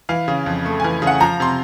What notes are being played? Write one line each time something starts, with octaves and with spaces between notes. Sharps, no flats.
E3 F5
C#3
F2
A3
E3 G#5
C#3
F#5
F3 A#5
C3 C6